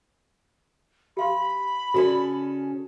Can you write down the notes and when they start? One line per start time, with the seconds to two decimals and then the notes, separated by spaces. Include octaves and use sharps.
1.17 G4 F5 B5 C6
1.94 C#3 C#4 F#4 A4 D5